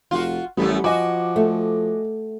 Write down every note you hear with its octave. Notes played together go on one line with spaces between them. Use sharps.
F1 F4 F#4
A1 F#2 G3 A3 B3
F3 F#4 D#5 G#5 D6
A3